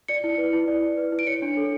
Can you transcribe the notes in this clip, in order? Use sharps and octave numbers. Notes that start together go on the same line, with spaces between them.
D5 C#7
E4
B4
E4
D5
E4
B4
E4
D7
C#5 C#7
D4
A4